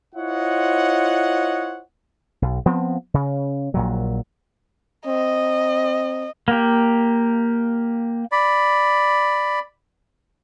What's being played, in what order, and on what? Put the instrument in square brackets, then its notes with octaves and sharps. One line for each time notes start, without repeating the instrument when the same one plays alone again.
[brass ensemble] E4 F4 C5 C#5 D#5 F#5
[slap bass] B1
F3 B3 C4
C#3
A#1 A#2 F#3
[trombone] C4 [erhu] D#5
[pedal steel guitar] A#3 G4
[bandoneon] D5 B5